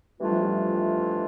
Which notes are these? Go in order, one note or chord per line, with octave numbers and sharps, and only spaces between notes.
F2 E3 G3 A3 D4 F4
F3
G3